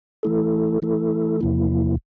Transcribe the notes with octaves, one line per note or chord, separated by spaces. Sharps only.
E3 A3 E4 A4
E3 A3 E4 A4
E2 C3 F3 A#3 E4